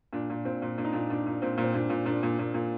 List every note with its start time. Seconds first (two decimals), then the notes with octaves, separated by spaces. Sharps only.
0.13 A#2 D4
0.30 A#2
0.45 A#2 C4
0.62 A#2
0.78 A#2 D4
0.85 D#4
0.93 A#2 D4
1.10 A#2 D4
1.26 A#2
1.42 A#2 C4
1.58 A#2
1.64 C4
1.75 A#2 D4
1.90 A#2
2.06 A#2 D4
2.23 A#2
2.39 A#2
2.54 A#2